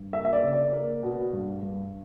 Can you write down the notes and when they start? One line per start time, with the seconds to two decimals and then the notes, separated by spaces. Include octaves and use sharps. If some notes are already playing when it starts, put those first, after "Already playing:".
Already playing: G2
0.13 A#3 E5
0.25 E5
0.33 D5
0.43 C#3
0.53 D5
0.73 A#3
1.03 B2
1.33 G2
1.63 G2